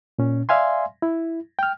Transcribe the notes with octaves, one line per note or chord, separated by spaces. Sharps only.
A#2 C#4
D5 E5 F5 G#5 C6
E4
G5 F6